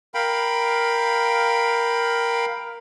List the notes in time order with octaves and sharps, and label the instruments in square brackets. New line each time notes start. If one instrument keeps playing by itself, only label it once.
[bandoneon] A#4 F5 G5 B5